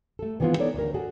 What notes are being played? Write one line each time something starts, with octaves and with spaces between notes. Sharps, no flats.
A3 A4
D#3 E3 G#3 B3 C4 F4
B3 D#4 A4 C#5 D5
D2 A#4
F#4 G#4 A4